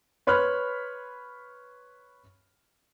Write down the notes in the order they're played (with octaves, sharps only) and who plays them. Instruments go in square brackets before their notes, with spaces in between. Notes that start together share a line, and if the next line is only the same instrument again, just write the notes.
[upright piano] B4 C#5 B5 C6 F6 F#6